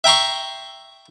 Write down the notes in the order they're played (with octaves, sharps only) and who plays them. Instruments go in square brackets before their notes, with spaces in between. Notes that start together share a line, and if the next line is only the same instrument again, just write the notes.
[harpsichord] E5 G5 A#5 C6 C#6